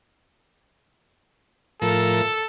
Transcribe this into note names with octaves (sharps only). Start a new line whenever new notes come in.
A2 F3 A4 A#4